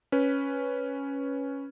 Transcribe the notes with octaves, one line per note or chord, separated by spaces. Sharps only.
C#4 B4